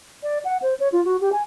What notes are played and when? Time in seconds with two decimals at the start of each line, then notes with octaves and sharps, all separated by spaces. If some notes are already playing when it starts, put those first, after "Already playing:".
0.23 D5
0.45 F#5
0.62 C5
0.80 C#5
0.92 F4
1.05 F#4
1.21 G4
1.32 G#5